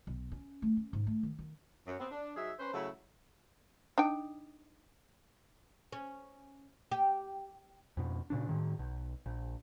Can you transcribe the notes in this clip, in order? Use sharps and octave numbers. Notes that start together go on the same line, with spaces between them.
B1
C#4
A3
C#4
G#2
A3
D#3
D#3
F#2
B3 C4
D4
F#3 D#4 G#4 E5
C#4 B4 C5
C#3 F#3 A3 E4
D4 D#4 G5
C#4
G4
F2 B2
A#2 C#3 D4
A2 D#3
B1
A#1